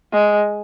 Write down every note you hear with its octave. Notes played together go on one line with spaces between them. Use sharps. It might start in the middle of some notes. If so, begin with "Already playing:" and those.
G#3